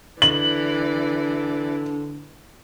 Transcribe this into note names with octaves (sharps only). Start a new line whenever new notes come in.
D3 E3 D5 F#7